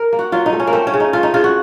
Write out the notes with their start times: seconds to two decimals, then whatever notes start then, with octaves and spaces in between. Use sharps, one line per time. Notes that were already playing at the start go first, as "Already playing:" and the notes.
Already playing: A#4
0.13 A#3
0.19 F#4
0.32 F#3 F4
0.46 D#4
0.53 A3
0.60 C#4
0.67 A#3
0.73 A3 C4
0.87 C#4
0.94 C#3
1.00 D#4
1.13 A3 F4
1.23 D#4
1.34 C#3 F4
1.44 F#4